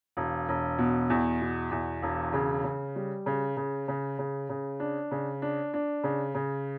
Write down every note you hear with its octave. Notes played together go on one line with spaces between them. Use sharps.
E1
E1
B2
E2
B2
E2
E1
C#3
C#3
G3
C#3
C#3
C#3
C#3
C#3
D4
C#3
D4
D4
C#3
C#3